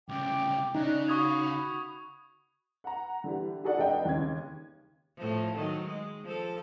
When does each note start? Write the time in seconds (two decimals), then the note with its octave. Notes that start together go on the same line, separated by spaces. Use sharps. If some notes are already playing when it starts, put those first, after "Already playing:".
0.09 C2 C#3 G5 D6
0.75 C#3 D#4 D5 D#5 F#6
1.08 F#4 B5 C#6 D#6 G#6
2.84 F#5 A#5
3.24 D3 E3 G3
3.63 D#4 F#4 G#4 A4 D5 F#5
3.78 F1 D4 D#5 G5
4.05 D#2 C#3 G#6
5.17 A2 F3
5.55 D#3 F#3
5.86 G#3
6.24 F3 A4